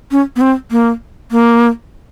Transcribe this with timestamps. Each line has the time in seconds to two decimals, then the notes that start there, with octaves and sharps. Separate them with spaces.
0.12 C#4
0.36 B3
0.41 C4
0.71 A#3
1.31 A#3